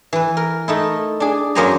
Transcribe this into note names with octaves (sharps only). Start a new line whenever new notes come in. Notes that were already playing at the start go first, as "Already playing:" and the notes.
E3 B4
A#4
A3 D#4 E4
D4 G#4
F#2 F#3 A#3 C5 G#5 A#5